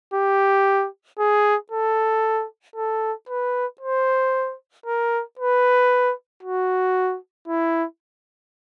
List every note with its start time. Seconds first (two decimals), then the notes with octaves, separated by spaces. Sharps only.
0.14 G4
1.19 G#4
1.72 A4
2.76 A4
3.29 B4
3.81 C5
4.86 A#4
5.39 B4
6.43 F#4
7.48 E4